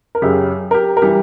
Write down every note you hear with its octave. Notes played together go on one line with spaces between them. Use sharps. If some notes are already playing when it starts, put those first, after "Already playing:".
A#4
F#2 C#3 F#3 G4
A#4
G4
A#4
E3 G3 G4